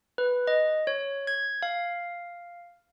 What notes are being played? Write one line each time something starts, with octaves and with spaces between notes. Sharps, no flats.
B4
D#5
C#5
G#6
F5